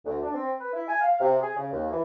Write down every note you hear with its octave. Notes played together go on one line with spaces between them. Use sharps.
D2
D4
C4
B4
E4
G#5
F5
C3
G#4
C#3
D#2
E3